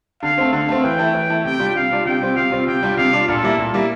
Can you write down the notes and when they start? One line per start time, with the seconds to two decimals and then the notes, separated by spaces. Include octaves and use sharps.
0.23 D3 F5
0.38 A3 C4
0.53 D3 F5
0.68 A3 C4
0.84 E3 G5
0.99 A3 E4
1.15 E3
1.30 A3 E4
1.44 C3 G5
1.59 G3 D4 F4
1.75 C3 F5
1.91 G3 D4 F4
2.06 C3 G5
2.21 G3 C4 F4
2.36 C3 F5
2.51 G3 C4 F4
2.67 C3 G5
2.83 G3 D4 F4
2.97 C3 F5
3.13 G3 D4 F4
3.28 A#2 A4
3.42 G3 A#3 E4
3.58 A#2
3.74 G3 A#3 E4